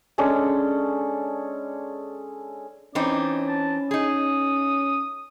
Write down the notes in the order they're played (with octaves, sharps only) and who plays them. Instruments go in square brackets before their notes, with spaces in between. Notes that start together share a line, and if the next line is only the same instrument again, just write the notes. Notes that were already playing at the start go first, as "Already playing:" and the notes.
[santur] G#3 C#4 D4 A4
[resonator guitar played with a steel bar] E3 C4 D#4 [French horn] C#4 [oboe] D5
[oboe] A5
[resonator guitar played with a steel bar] D#4 G#4 [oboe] D#6